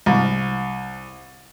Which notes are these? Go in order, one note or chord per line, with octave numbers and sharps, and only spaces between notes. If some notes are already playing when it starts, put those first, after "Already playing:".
C2